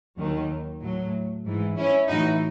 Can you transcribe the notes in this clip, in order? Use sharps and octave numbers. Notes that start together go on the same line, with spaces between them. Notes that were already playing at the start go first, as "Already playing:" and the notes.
D#2 D#3 F#3
A2 F#3
G#2 E3
C#4 E4
A2 E3 D#4 F#4